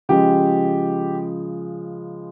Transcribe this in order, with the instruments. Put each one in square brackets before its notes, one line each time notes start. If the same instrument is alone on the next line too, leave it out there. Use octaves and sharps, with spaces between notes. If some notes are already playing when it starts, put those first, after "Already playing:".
[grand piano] C#3 F3 G#3 G4